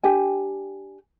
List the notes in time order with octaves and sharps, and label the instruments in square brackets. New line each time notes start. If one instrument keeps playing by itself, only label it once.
[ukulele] D4 G4 G5 G#5